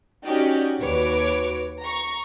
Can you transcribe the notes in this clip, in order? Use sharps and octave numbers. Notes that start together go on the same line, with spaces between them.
C#4 D#4 F#4 G4 D5
D#2 F#4 B4 C#5 D6
A#5 C#6